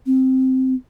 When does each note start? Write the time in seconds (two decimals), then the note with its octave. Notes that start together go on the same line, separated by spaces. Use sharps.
0.06 C4